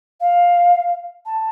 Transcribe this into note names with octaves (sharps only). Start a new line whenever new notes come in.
F5
A5